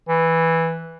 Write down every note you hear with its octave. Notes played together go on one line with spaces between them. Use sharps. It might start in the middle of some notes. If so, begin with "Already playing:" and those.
E3